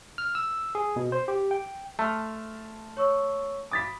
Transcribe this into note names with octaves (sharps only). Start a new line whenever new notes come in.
F6
E6
G#4
B2
C5
G4
G5
A3 A5 C6 F6
C#5 C#6 E6
B5 D6 D#6 A6 B6